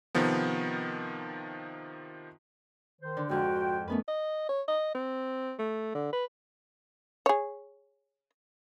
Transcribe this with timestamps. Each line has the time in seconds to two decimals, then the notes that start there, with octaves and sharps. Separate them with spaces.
0.15 C3 D#3 F3 B3
3.01 D#3 C5
3.17 D3
3.29 F2 G#2 F#4 C5 F#5 G5
3.88 F#2 A3 B3 B4
4.08 D#5
4.49 C#5
4.68 D#5
4.94 C4
5.59 A3
5.95 D3
6.12 B4
7.26 G#4 C#5